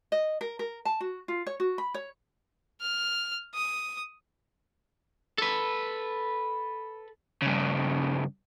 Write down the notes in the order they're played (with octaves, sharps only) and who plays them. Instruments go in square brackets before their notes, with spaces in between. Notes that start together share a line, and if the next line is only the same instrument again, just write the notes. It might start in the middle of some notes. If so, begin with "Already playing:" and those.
[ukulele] D#5
A#4
A#4
A5
F#4
F4
C#5
F#4
B5
C#5
[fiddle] F6
D#6
[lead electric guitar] A4 B4
[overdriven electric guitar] G2 C#3